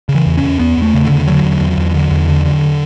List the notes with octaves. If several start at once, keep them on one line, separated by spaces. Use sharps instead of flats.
C#3
E3
E2
C#4
E2
E2 B3
E2 A3
C#3
D3
E2
D3 F#3
E2
E2
E2
D3
E2
D3
D3